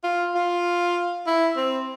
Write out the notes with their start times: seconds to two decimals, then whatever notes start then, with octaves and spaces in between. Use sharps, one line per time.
0.04 F4
0.35 F4
1.27 E4
1.57 C4